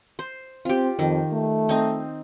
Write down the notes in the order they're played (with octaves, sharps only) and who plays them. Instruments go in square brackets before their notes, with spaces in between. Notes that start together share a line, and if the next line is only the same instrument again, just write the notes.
[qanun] C5
[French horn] C4 [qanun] F4 G4
[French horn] F2 [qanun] D#3
[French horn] A3
[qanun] C4 D#4